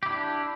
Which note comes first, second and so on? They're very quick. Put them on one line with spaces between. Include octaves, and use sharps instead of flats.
G4 E4 D4